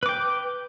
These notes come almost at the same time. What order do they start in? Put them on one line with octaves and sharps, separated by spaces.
B4 D6 G5